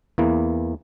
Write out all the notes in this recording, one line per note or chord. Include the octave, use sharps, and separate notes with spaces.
E2 E3 A#3